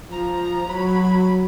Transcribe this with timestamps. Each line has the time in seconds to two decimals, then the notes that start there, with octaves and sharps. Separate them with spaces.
0.11 F3 A#5
0.69 F#3 B5